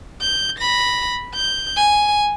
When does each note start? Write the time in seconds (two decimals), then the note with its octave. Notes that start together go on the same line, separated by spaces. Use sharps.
0.21 G6
0.59 B5 A#6
1.35 G6
1.76 G#5